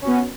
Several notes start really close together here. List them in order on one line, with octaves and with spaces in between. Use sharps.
C#4 F#4 B3